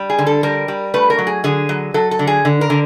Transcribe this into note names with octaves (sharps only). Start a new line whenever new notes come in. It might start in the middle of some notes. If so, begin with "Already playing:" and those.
Already playing: G3
G#4
D3
A4
G3 A#4
G3
A3 B4
A#4
F#3
G#4
D3 G#4
F#3
F#3 A4
A4
D3
G#4
D3
A#4
D3